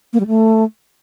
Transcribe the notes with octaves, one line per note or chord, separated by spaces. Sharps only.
A#3
G3
A3